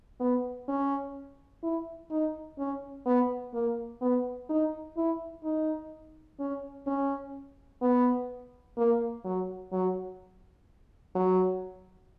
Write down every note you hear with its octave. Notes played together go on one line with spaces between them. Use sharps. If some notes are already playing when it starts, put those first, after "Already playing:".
B3
C#4
E4
D#4
C#4
B3
A#3
B3
D#4
E4
D#4
C#4
C#4
B3
A#3
F#3
F#3
F#3